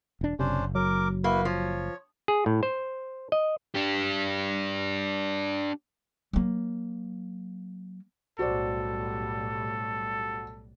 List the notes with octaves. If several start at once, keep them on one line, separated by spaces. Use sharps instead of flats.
E1 D4
F#1 C3 C#4 D4 C5
F#3 A#4 D6
A#3 E4 F#4 B4
F3 C#5
G#4
A2
C5
D#5
D4 G4
F#3 A#3
B1 A2 G3 F#4 A4 C5 D5